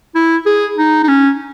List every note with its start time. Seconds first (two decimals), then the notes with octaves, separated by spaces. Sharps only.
0.15 E4
0.46 G#4
0.77 D#4
1.04 D#4
1.08 C#4